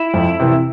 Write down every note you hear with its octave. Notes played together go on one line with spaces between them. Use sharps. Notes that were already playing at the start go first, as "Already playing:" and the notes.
Already playing: E4
F2
C3 E3